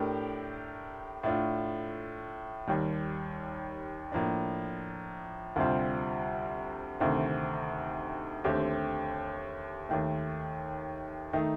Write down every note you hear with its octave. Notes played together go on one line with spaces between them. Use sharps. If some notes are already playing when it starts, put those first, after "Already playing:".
Already playing: A2 A3 D4 G4 A#4
A2 A3 D4 F4
D#2 D#3 G3
A2 F3 A#3 D4
D2 C3 G3 C4 F4
D2 C3 D#3 A3 C4
D#2 D3 A3 C4 G4
D#2 D#3 A3
D#3 A3 D#4